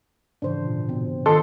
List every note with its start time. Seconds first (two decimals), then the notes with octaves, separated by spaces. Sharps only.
0.42 G#2 C#3 E3 D4 C5
0.66 A#2
0.89 B2 C4
1.26 D#3 F4 A4 C5 D#5 C6